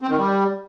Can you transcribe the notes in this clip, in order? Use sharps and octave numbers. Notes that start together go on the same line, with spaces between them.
C4
D#3
G3